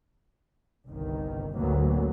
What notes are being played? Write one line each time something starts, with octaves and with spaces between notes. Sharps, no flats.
G1 C2 D#3
A1 D2 F#3 A#3 B3